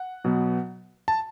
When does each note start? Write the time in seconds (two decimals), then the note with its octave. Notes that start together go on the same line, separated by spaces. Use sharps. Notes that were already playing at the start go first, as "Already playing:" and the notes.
Already playing: F#5
0.24 B2 F#3 B3
1.08 A5